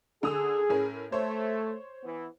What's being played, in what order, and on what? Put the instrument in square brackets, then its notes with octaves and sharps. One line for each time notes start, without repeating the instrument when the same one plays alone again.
[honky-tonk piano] D3 D#6 E6 [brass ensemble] G#4
[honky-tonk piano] A2 C#4 A#4
[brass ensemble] A3 [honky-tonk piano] C5 C#5
[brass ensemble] E3 B3